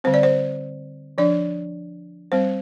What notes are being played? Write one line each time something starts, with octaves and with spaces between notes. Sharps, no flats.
D3 G3 C4 C5
D5
C5
F3 D4 D5
G3 C4 C5